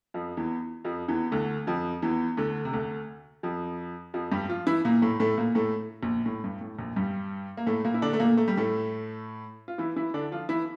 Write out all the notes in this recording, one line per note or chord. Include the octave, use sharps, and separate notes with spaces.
F2 F3
E2 E3
F2 F3
E2 E3
D2 D3
F2 F3
E2 E3
D2 D3
C3
D2 D3
F2 F3
F2 F3
G2 G3
F3 F4
E3 E4
A#2 A#3
A2 A3
A2 A3
A#2 A#3
A2 A3
A#1 A#2
A2
G2
A2
A#1 A#2
G2 G3
A#3
A2 A3
A#2 A#3
E4
D3 D4
A3
A#2 A#3
A3
G3
A2 A3
F4
E3 E4
E3 E4
D3 D4
F3 F4
E3 E4